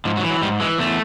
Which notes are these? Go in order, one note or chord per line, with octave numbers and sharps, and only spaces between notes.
G#2 F3
F#3
E3
F#3
G#2 G3
E3 G#3
E2 A3